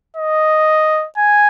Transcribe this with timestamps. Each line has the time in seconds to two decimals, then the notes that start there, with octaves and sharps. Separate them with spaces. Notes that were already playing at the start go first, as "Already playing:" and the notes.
0.17 D#5
1.18 G#5